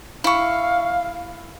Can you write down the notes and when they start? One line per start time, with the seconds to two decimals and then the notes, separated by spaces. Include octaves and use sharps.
0.24 E4 F5 C#6